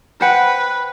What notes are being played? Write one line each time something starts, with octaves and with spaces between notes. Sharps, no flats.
B4 C5 F#5 G5